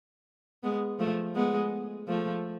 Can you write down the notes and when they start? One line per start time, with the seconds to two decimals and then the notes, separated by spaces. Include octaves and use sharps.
0.63 G#3 B3
0.99 F3 A3
1.35 G#3 B3
2.08 F3 A3